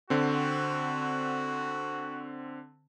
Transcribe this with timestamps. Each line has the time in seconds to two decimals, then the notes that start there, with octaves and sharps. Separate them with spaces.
0.10 D3 C4 F#4